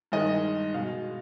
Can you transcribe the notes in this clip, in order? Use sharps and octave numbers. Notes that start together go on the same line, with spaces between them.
G2 D#3 G#3 D#5
B2 G#3 F5